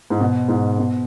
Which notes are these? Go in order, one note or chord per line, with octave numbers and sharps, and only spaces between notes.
G#2
B2
G#2
B2